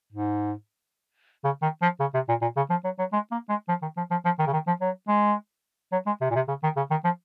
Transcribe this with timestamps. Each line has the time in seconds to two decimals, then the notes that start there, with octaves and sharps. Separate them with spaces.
0.13 G#2
1.44 C#3
1.62 D#3
1.82 F3
2.00 C#3
2.14 C3
2.29 A#2
2.42 A#2
2.56 C#3
2.70 F3
2.84 F#3
2.99 F#3
3.13 G#3
3.31 A#3
3.49 G#3
3.69 F3
3.82 D#3
3.97 F3
4.11 F3
4.25 F3
4.39 D#3
4.47 C#3
4.53 D#3
4.67 F3
4.81 F#3
5.08 G#3
5.92 F#3
6.07 G#3
6.21 C3
6.30 A#2
6.35 C3
6.48 C#3
6.63 D#3
6.76 C#3
6.91 D#3
7.04 F3